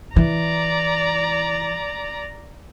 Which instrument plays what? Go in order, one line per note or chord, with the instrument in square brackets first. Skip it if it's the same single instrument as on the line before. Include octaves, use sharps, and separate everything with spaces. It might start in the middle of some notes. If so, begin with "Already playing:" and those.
[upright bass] E3 [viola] D5 A#5